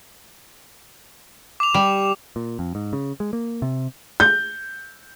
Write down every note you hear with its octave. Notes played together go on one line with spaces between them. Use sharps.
D6 F7
G3
A#2
F2
G#2
C#3
G#3
A#3
C3
G6